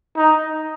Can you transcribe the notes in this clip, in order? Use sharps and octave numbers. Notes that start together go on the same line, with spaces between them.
D#4